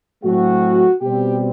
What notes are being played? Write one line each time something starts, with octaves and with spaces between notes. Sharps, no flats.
A2 F#3 A3 C4 F#4
B2 G3 C4 G4